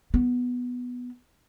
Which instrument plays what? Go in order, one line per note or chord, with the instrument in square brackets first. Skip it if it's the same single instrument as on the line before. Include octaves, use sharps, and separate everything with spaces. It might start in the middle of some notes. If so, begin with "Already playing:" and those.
[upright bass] B3